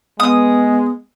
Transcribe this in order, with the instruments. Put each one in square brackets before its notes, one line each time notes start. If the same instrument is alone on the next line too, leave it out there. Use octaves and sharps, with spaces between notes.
[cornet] G#3 [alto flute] B3 [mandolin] D#6